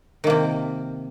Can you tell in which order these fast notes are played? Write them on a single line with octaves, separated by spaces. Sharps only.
D#3 A#3 C3